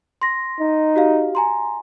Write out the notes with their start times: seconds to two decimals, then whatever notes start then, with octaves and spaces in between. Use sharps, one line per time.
0.21 C6 A#6
0.60 D#4
0.96 F#4 G4 F5
1.35 G#5 A#5 C6